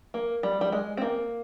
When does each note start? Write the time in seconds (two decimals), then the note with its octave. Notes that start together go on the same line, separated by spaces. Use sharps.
0.14 A#3
0.43 G3
0.61 G3
0.72 G#3
0.97 C4
1.02 A#3